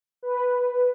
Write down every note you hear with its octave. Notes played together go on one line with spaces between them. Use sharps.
B4